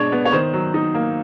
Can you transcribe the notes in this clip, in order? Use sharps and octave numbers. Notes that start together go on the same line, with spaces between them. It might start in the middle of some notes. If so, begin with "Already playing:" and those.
Already playing: B2 G#3 D4 C#5
B3
C#5
D#3 C5
F#3
D#4
A#3